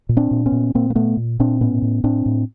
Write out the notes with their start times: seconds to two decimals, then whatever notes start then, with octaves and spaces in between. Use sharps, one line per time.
0.09 A#2
0.17 C4 D4
0.31 A#2
0.46 B3 C#4
0.52 A#2
0.74 A#2 A#3 C4
0.90 A#3
0.95 A#2 A3 B3
1.17 A#2
1.39 A#2 C4 D4
1.61 A2 B3 C#4
1.82 A2
2.04 A2 C4 D4
2.26 A2